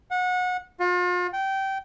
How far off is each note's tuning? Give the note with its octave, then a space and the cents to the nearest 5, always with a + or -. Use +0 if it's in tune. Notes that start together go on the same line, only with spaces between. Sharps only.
F#5 -25
F4 +40
G5 -20